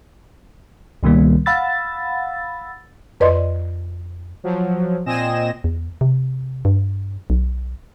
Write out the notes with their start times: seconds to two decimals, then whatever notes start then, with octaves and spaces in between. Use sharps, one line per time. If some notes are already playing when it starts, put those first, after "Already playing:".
1.03 C#2 B2 D#3 G3 A#3
1.46 F5 F#5 B5 E6 A6
3.20 F2 B4 D5 D#5 C6
4.44 F3 F#3
5.06 A#2 C4 D#5 G#5 A#6 E7
5.64 E2
6.01 C3
6.65 G2
7.30 B1